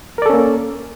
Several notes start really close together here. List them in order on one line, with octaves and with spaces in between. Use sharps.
A#4 D5 A4 C#4 A#3